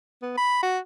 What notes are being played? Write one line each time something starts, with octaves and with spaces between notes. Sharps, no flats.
B3
B5
F#4